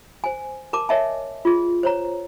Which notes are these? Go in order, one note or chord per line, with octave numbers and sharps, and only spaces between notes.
C5 G#5
A#4 A5 D6
A#4 C#5 D#5 E5 G#5 A5
F4 G#4
C5 C#5 A#5